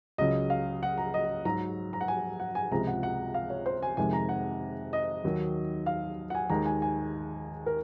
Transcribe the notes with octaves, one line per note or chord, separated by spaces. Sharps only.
C#2 C#3 F#3 D#5
F5
F#5
A#5
D#5
G#2 F#3 A#5
A#5
F#5
G#5
F#5
G#5
C#2 C3 F3 G#3 A#5
F#5
F#5
F5
C#5
C5
G#5
F2 C3 D#3 G#3 G#5
A#5
F#5
D#5
D#2 D#3 F#3
F5
F#5
G#5
D#2 D#3 G#3 A#5
G#5
G#5
A#4